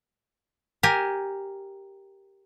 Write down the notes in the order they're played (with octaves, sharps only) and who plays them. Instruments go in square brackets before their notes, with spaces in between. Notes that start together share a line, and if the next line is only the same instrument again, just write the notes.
[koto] G4 A#4 G#5